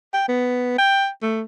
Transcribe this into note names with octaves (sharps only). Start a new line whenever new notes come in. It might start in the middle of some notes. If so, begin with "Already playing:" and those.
G5
B3
G5
A3